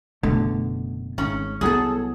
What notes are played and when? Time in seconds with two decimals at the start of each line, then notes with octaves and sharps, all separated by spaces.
0.23 F#1 B2 D3 A3
1.18 G#1 C#4
1.61 C2 F#3 B3 G#4 A4